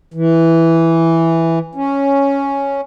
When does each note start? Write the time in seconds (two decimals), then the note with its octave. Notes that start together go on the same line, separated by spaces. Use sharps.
0.14 E3
1.75 C#4